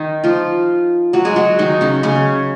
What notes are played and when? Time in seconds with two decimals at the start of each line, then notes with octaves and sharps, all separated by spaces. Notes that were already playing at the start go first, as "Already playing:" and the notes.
Already playing: D#3 D#4
0.24 F3 F4
1.13 F#3 F#4
1.25 G#3 G#4
1.36 F#3 F#4
1.59 D#3 D#4
1.81 C#3 C#4
2.03 C#3 C#4